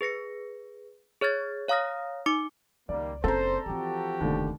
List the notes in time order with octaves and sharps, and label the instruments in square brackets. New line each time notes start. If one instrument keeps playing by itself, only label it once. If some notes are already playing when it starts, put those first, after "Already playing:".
[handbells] G#4 B4 A#6 C#7
G#4 C#5 F6 G#6 A6
C#5 F5 A#5 D#6 F6 A#6
D#4 D6 C#7
[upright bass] C#2 [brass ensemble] D#3 G3 A#3 [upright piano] D5
[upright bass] F#1 C4 [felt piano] A4 A#5 [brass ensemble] C5
[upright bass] E3 C4 [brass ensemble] F3 F#4 G4
[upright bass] F1 [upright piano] D#2 D3